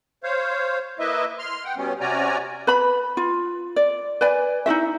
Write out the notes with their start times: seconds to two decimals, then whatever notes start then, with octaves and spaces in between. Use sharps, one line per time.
0.24 C5 C#5 F5
0.99 A#3 E4 B4 D#5 E5
1.39 C6 F6
1.64 F#5 G5
1.76 B2 G3 B3 C#4
2.00 C3 C#4 F#4 D5 G#5 A#5
2.67 B4 B5
3.17 F4
3.76 D5
4.21 B4 D5 G#5
4.66 D#4 E4 F#4 E5